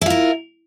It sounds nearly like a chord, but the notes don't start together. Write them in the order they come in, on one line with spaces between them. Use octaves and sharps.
E4 F4 A#4